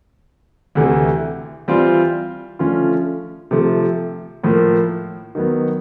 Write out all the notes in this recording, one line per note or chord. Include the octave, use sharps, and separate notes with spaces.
D2 C3 E3 A3
E3 G3 C4 F4
D3 F3 A3 C#4 F4
C3 F3 A3
A2 F3 A#3
D#3 F#3 B3